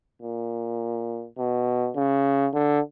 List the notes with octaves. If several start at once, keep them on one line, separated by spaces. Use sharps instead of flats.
A#2
B2
C#3
D3